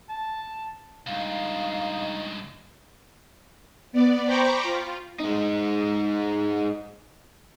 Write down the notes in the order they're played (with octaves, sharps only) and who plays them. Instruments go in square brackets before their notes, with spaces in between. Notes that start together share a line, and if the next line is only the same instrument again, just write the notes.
[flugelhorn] A5
[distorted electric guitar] C#2 G2 [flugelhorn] D#4 [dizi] F5
[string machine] B3 D5
C5 G5 A#5 B5 C#6 D6
F4
[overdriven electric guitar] G#3 D#4